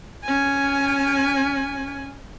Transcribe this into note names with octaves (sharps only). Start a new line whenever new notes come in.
C#4 G#5